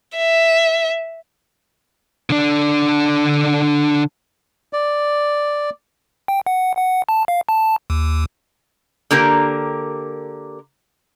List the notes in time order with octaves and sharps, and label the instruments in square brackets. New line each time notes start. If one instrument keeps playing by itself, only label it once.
[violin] E5
[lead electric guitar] D3 D4
[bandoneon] D5
[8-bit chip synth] G5
F#5
F#5
A5
F5
A5
D#2
[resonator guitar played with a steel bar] D3 A#3 G4 A#4